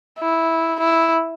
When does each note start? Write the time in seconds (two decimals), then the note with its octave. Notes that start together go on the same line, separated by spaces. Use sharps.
0.20 E4
0.80 E4